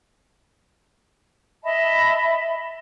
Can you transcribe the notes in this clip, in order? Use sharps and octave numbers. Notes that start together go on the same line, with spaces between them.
D#5 E5 A5 B5